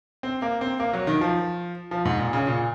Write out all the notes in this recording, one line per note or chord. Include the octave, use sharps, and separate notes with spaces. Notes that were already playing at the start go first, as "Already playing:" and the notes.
C4
A#3
C4
A#3
F#3
D#3
F3
F3
G#2
A#2
C#3
A#2